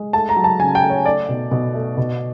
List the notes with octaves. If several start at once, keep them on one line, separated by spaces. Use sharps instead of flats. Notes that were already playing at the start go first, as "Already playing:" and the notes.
Already playing: G#3
A3 A5
A#5
F#3
A5
C#3 G#5
G5
A3
C#5
A3 D5
B2
B2
A3
B2